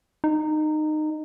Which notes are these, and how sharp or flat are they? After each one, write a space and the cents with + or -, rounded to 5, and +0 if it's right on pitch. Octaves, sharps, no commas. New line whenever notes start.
D#4 -20